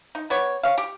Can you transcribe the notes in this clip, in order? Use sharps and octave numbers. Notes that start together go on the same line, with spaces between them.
D#4
B3 G4 C#5
C#5 F5
G4